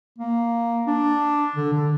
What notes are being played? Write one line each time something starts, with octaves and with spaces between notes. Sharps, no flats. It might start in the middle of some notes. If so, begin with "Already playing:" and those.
A#3
D4
D3
D3